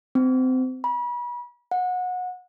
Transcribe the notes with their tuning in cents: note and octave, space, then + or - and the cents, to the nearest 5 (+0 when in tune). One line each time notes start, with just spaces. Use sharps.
C4 -25
B5 -35
F#5 -25